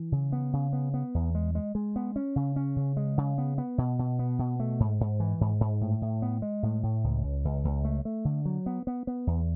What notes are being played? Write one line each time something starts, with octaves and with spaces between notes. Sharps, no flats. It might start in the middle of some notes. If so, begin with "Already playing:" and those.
Already playing: E3
C#3
B3
C#3
B3
B3
E2
G#3
G#3
G#3
B3
C#4
C#3
C#4
C#3
G#3
C#3
B3
B3
B2
B2
B3
B2
A3
G#2
G#2
E3
G#2
G#2
A2
A2
B3
G#3
A2
A2
C#2
C#2
C#2
C#2
A3
A3
D3
F#3
B3
B3
B3
E2